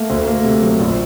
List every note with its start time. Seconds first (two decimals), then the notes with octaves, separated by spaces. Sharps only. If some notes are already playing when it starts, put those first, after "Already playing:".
Already playing: A3 A#3
0.10 D2
0.27 A#3
0.44 C3
0.62 F#3
0.80 A#1